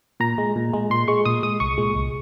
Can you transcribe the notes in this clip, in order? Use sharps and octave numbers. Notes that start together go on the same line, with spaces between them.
A#2 A#5
G#3
A#2
G#3
A#2 C6
G#3 C#6
A#2 D#6
G#3 D#6
C2 C#6
A#2 G#3
C2